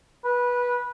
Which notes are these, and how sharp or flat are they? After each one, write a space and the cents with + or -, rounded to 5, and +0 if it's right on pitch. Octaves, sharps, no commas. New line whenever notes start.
B4 -15